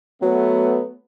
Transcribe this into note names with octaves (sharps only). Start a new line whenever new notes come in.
F#3 A3 B3